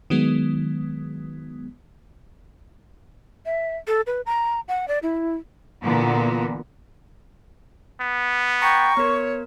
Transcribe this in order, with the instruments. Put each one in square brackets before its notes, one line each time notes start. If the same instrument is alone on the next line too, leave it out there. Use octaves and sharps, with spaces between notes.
[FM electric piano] D#3 F#3 G#3 B3
[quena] E5
A4
B4
A#5
F#5
D5
E4
[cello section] A#2 D3 E3 A#3 B3
[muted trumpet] B3
[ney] G5 [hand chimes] A#5 A#6 C#7 [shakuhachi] C#6
[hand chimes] B3 A#4 [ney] C#5